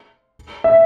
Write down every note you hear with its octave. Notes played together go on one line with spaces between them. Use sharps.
E5